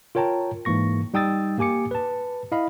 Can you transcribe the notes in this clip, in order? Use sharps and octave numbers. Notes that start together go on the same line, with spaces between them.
F4 A#4 C#5 G5 A5 A#5
G#2 E3 A#3 C#6 A#6
G3 D#4 G5 D#6 E6 A6
A#3 G4 G#5 D6 C#7
B4 A5
E4 D#5 F5 B5